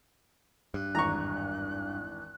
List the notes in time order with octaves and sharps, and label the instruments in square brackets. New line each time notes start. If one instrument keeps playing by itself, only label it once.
[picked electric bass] G2 [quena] F#6
[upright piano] G#1 E2 [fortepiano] A#5 C#6